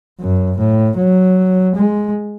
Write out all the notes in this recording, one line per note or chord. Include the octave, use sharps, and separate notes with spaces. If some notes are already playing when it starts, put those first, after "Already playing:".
F#2
A2
F#3
G#3